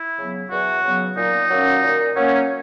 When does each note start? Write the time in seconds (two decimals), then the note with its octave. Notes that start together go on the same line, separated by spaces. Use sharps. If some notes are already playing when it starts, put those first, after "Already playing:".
Already playing: E4
0.19 C#3 F#3 B3
0.51 E2 F#4
0.84 C#3 F#3 B3
1.16 A#2 D#4
1.50 F#3 A#3 C#4
1.82 A#2
2.16 F#3 A#3 C#4